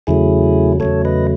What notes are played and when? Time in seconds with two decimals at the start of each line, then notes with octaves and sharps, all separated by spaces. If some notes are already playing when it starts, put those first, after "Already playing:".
0.07 E2 C#3 F#3 A3 E4 G#4
0.80 E2 C#3 F#3 A3 A4 C#5
1.05 B4 D#5